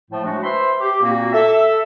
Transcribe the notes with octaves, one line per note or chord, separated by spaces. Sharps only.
A2 F3 A3
F#3 G#3 A3 D4 F#4
B4 C5 E5 B5 C6
G4
A#2 A#3 C4 F#4
A4 E5